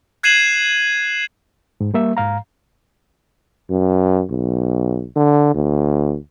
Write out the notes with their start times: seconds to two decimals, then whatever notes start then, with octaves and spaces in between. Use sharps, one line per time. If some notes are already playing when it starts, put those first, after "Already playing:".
0.23 F#6 G#6 C7 D#7 E7 F#7
1.80 G#2
1.94 G3 A#3 E5
2.17 G#2 F5 A#5
3.70 F#2
4.31 B1
5.16 D3
5.54 D2